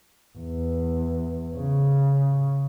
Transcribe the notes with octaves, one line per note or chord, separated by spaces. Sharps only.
E2
C#3